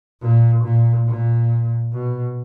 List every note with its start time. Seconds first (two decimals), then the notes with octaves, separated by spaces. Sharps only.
0.21 A#2
0.64 A#2
1.07 A#2
1.92 B2